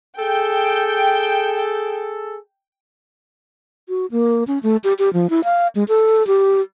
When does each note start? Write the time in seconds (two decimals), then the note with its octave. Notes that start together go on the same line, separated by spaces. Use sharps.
0.18 G#4 A4 G5
3.89 F#4
4.11 A#3
4.47 C#4
4.63 A3
4.84 G4
4.99 G4
5.13 F3
5.30 E4
5.44 F5
5.75 G#3
5.88 A4
6.27 G4